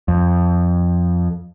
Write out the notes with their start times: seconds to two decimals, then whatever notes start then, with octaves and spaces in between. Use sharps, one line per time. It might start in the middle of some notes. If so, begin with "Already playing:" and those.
0.08 F2